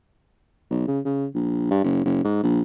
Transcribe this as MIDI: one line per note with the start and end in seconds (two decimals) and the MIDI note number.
0.71 0.84 35
0.88 1.00 49
1.05 1.26 49
1.35 1.69 34
1.71 1.81 43
1.84 2.02 30
2.05 2.24 30
2.24 2.40 44
2.44 2.62 34